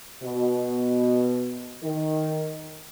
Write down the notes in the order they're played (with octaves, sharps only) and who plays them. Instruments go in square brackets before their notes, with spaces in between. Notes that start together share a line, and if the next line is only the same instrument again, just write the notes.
[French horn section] B2
D#3